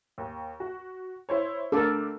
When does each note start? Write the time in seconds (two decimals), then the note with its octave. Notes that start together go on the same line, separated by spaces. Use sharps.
0.18 D#2
0.60 F#4
1.29 E4 C5 C#5
1.72 D3 A3 A4 A#4 D6